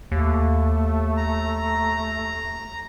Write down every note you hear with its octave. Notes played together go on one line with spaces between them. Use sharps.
D#2 A3
A#5